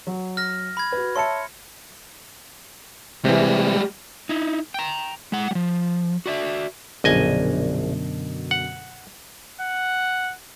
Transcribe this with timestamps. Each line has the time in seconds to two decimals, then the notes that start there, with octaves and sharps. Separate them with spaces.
0.07 F#3
0.37 F6 A#6
0.77 B5 G#6
0.92 F#4 B4
1.16 C#5 E5 A5 C6 C#7
3.25 C3 E3 G3 G#3
4.29 D#4 E4
4.74 G5 A#5
5.32 G#3 F#5
5.51 F3 G3
6.26 F#4 D5 E5
7.04 A#1 F#2 B2 D3 D#5 G#5
8.51 F#5
9.61 F#5